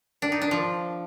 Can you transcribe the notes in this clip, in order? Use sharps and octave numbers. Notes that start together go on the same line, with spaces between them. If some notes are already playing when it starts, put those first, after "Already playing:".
D4
D#4
D4
F3